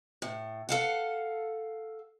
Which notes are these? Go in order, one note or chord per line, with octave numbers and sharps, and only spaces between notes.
A2
A4 F5 F#5